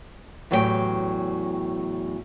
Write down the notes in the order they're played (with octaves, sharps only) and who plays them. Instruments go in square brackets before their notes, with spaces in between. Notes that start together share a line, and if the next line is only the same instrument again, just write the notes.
[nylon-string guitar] E2 A2 F#3 G4 B4 G5